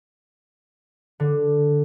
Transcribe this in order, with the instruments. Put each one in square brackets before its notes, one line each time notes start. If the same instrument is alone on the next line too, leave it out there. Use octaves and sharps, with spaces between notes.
[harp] D3